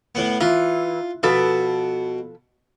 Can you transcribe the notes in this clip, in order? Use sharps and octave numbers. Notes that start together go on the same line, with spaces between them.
A2 B3
E3 F4
B2 F3 A4 B4